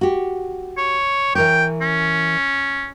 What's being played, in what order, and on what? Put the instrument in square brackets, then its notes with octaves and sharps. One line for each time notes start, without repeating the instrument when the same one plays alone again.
[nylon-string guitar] F#4 G4
[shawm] C#5
[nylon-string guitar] E3 A#4 C#5 [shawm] G5
[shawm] C#4